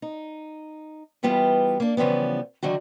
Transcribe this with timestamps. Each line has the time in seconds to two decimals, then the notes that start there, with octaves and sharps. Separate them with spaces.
0.02 D#4
1.23 E3 G3 B3 E4 F4 G4
1.80 A#3 D4
1.97 C#3 E3 F3 G3 B3
2.63 D3 D#3 F#3 F#4